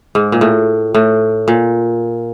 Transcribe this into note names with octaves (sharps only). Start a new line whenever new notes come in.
G#2
A#2
A2
A2
A#2